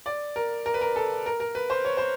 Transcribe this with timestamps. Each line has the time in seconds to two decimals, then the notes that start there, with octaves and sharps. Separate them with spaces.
0.06 D5
0.36 A#4
0.66 A#4
0.74 B4
0.81 A#4
0.96 A4
1.26 A#4
1.40 A#4
1.55 B4
1.70 C5
1.85 C#5
1.97 C5